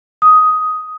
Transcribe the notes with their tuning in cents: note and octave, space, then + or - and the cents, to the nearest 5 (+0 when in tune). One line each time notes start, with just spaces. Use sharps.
D#6 +10